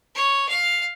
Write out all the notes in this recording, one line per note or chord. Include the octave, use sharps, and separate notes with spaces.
C#5
F5